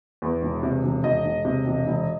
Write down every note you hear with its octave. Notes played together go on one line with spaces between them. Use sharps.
E2
E1
C3
E1
E1 D#5
E1
C3
E1
E1